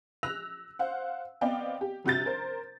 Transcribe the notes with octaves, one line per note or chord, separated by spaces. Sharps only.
E6 F#6 A#6 F7
C5 F5 F#5
B3 C4 D5 D#5 F5 G5
G4
G1 C3 F#4 G6 A6
A#4 C5